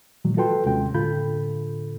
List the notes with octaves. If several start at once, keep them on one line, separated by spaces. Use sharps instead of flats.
A#2 D#3 E3 F#3 G#3
F4 F#4 A4 B4 G5 C6
D#2 C3 G#3 C#4 G5
A2 D3 F4 A4 B5 G6